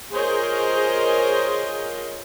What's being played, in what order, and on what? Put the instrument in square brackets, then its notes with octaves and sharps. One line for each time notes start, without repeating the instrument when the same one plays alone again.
[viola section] F4 G#4 A#4 C5 C#5 D#5